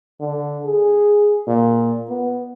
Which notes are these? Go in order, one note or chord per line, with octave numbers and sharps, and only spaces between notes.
D3
G#4
A#2
B3